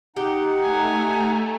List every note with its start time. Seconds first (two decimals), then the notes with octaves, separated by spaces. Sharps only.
0.16 D#4 G4 F#5
0.62 A3 G#5 A#5